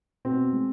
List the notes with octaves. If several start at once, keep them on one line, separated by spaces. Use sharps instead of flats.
B2 C4
G#3